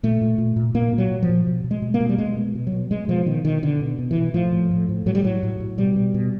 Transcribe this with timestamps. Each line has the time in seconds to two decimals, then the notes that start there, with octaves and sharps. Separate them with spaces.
0.03 A#2 A3
0.21 A#2
0.38 A#2
0.56 A#2
0.74 A#2 A#3
0.93 A#2
0.98 F#3
1.11 A#2
1.22 F3
1.29 A#2
1.47 B2
1.64 B2
1.71 G#3
1.82 B2
1.94 A#3
2.00 B2
2.09 G3
2.18 B2 G#3
2.37 B2
2.55 B2
2.67 F#3
2.72 B2
2.91 B2 G#3
3.08 B2 F3
3.26 B2 D#3
3.45 B2 D#3
3.62 B2 D3
3.81 B2
3.99 B2
4.11 E3
4.16 B2
4.34 A2 F3
4.52 A2
4.71 A2
4.89 A2
5.06 A2 F#3
5.15 G3
5.24 A2 F#3
5.43 A2
5.60 A2
5.78 B2 G3
5.96 B2
6.14 B2